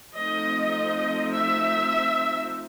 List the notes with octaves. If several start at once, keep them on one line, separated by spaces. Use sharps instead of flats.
F3 A3 C4 D#4 D#5
E5